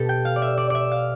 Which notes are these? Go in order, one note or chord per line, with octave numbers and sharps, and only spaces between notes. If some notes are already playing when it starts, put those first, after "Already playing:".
Already playing: B2 B3 G4 A4
G5
F5
D5
E5
D5
D5 E5
F5